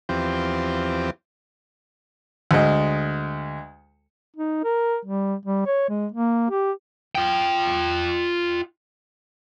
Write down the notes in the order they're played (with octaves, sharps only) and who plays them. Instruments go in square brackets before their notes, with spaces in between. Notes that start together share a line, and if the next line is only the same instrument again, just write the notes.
[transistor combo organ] E2 F3 C4 G4
[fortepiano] D2 G#3
[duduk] D#4
A#4
G3
G3
C#5
G#3
A#3
G4
[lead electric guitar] F4 G5